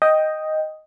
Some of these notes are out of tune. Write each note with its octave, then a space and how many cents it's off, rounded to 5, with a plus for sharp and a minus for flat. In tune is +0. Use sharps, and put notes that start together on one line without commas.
D#5 +0 G5 +0